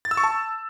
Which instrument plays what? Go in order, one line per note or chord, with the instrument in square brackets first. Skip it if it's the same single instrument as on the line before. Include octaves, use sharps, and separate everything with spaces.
[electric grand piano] A6
E6
C#6
A5